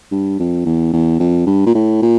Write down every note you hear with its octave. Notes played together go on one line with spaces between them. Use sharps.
G2
F2
E2
E2
F2
G2
A#2
A2
A#2